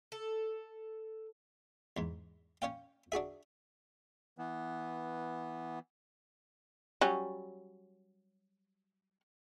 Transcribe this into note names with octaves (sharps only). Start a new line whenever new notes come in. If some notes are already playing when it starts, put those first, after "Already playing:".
A4
E2 G#2
C#4 C#5 F5 G5
D4 F#4 G#4 E5
E3 B3
F#3 G3 C#4